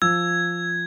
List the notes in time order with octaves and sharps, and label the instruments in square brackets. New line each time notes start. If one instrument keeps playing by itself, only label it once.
[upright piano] F3 [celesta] E6 [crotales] G#6